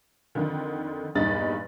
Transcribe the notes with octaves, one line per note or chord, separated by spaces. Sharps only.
F2 D3 D#3
E2 G2 A#2 D#4 B5 A6